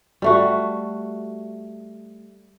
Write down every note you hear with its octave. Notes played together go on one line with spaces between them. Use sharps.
G3 A3 F#4